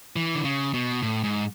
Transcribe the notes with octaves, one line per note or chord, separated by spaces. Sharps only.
E3
D3
C#3
B2
A2
G#2